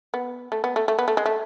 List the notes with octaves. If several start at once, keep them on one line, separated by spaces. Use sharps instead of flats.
B3
A3
B3
A3
A3
B3
A3
G#3
A3